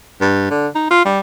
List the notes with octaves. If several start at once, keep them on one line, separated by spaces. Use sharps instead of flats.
G2
D3
D#4
F4
G3